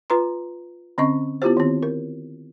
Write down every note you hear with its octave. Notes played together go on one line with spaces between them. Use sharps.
F4 B4 A#5 C6
D3 C4 C#4 D#5 C#6
B3 E4 F4 G4 C5
D#3 C4
A#4